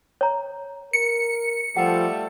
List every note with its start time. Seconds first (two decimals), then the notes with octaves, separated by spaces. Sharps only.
0.21 C#5 A#5
0.93 A#4 C#7
1.77 F3 G3 A3 A4 F#5